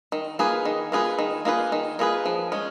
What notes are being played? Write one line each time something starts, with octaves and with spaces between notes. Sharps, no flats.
D#3
A#3 F4 G#4 B4
D#3
A#3 F4 G#4 B4
D#3
A#3 F4 G#4 B4
D#3
A#3 F4 G#4 B4
F3
G#3 C#4